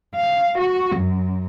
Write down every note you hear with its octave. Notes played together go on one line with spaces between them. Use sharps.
F5
F#4
F#2